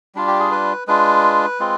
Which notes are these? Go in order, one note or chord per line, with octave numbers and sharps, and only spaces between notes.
G3 D4 F4
G4
G#4
B4
G#3 D4 F4 B4
G#3 C4 F4